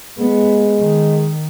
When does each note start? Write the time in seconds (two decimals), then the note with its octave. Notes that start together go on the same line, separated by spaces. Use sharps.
0.19 G#3 B3
0.80 D#3